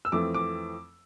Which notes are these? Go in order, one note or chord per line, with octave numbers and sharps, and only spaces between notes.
E6
F2 E3 A3 C4 D6
D6